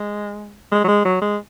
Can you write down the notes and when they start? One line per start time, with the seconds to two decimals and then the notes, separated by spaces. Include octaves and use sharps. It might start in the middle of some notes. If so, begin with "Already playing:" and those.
Already playing: G#3
0.72 G#3
0.84 F#3
0.88 G#3
1.05 F#3
1.22 G#3